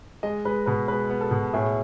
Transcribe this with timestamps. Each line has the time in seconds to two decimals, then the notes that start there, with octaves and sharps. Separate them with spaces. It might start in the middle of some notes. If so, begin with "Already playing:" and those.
0.23 G#3 D#5
0.45 G#3 B4
0.66 B2 B4
0.88 G#3 B4
1.10 B3
1.21 A4
1.31 B2
1.53 A2 G#4